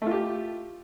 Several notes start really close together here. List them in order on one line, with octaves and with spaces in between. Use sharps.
A3 F4 G4